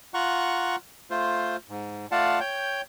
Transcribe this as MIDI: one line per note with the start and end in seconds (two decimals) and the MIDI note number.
0.14 0.76 65
0.14 0.76 78
0.14 0.76 82
0.14 0.76 85
0.14 0.76 90
1.10 1.56 57
1.10 1.56 65
1.10 1.56 72
1.69 2.06 44
2.12 2.39 57
2.12 2.39 65
2.12 2.39 74
2.12 2.39 77
2.12 2.39 78
2.12 2.39 81
2.40 2.81 73
2.40 2.81 79
2.40 2.81 91